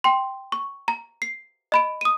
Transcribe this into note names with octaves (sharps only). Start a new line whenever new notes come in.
G5 C6
C#6
A#5
C7
D#5 B5 D7
D#6 D#7